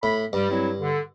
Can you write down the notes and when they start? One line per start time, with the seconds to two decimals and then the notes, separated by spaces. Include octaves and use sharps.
0.03 A2 B5
0.33 G2 G3
0.51 F#3 C4 E4
0.80 D3